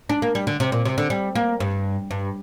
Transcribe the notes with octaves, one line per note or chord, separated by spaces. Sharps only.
D4
A#3
G3
D3
C3
A#2
C3
D3
G3
A#3
G2
G2